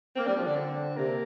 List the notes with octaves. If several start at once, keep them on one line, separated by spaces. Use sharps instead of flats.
A#3 C4
G3 D4
F3 C4
D3 D4
C4
C3 A#3